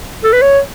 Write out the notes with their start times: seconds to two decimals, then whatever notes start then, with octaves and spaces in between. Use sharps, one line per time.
0.24 A4
0.33 B4
0.42 C#5